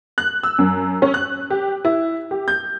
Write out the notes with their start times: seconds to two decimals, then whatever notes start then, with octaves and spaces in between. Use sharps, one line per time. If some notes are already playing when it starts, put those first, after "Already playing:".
0.18 F#6
0.43 E6
0.58 F#2
1.02 C#4
1.14 F#6
1.50 G4
1.85 E4
2.31 G4
2.48 G6